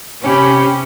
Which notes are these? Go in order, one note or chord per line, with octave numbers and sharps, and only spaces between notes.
C3 C#4 G4 B5